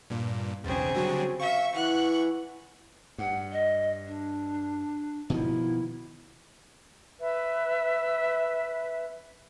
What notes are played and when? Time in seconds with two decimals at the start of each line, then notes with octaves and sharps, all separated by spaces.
0.10 G2 A#2
0.64 B1 E2 C#3 C4 G#4
0.95 D3 F#3 G3 F#4
1.40 E5 F5 C#6
1.75 E3 F#5 F#6
3.18 G2 F#5
3.52 D#5
4.06 D4
5.30 B2 D#3 F3 E4
7.21 B4 E5